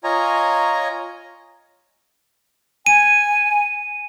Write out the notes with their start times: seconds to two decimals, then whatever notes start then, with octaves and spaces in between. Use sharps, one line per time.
0.04 F4 C#5 D#5 G#5 A#5
2.86 G#5 D#7